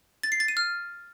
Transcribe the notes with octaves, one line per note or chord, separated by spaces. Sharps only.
A6
C7
A6
D#7
F6